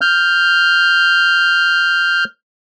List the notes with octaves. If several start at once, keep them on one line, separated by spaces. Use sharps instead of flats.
F6 G6